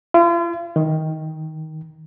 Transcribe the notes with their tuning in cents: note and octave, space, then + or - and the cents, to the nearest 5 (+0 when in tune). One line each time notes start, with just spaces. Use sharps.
F4 -40
D#3 +15